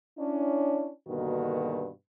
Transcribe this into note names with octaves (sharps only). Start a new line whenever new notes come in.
C#4 D4 E4
G2 B2 D3 D#3 A#3 F#4